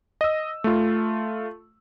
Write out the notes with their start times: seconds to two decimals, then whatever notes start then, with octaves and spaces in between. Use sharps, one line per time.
0.21 D#5 E6
0.64 A3 F4